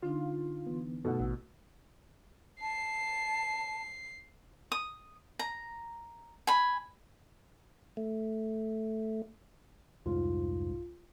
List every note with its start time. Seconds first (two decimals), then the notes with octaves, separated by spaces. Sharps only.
0.03 D3 D4 D#4 F4
0.67 E3 B3
1.05 F#2 B2 A3 D#4 A4 F#5
1.20 A1 A2 E6
2.61 A5 C7
4.72 D#6
5.39 A#5
6.47 G#5 B5
7.97 A3
10.06 C2 F2 G#2 F4